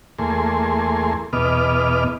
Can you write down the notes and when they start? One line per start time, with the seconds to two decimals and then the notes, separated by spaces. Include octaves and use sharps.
0.19 E2 A3 A#3 G#4 C6
1.33 E2 B2 B3 D#5 D6 F6